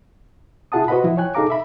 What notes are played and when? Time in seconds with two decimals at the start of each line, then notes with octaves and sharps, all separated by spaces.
0.72 E4 F4 G#4 F#5 A5 D#6
0.88 F#4 B4 C5 D#5 F#5 B5
1.04 F3 E4
1.17 C#5 G5 G#5 F#6
1.35 D#4 G#4 A4 F5 A#5 D6
1.50 E5 B5